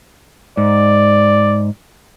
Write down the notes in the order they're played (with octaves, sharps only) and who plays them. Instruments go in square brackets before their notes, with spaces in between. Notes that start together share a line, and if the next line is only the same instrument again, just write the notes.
[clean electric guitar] G#2 [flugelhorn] D5